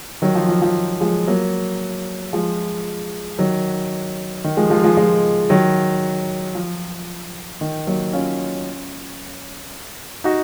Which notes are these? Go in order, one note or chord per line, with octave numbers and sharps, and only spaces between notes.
D#3 F#3
F3
F3
F3
F3 G#3
F#3 A#3
F3 G#3
D#3 F#3
D#3
F3 G#3
F3 G#3
F3 G#3
F3 G#3
D#3 F#3
F3
D#3
F#3 A#3
C#4 F4
D#4 F#4